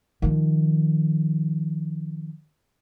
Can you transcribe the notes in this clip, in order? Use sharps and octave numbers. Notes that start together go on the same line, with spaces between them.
D#3 F3